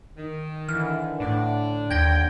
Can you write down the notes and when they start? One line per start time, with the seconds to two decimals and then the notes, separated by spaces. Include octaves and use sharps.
0.18 D#3
0.69 D3 E3 F6
1.20 A2 D4
1.91 D#2 G5 G#6 A#6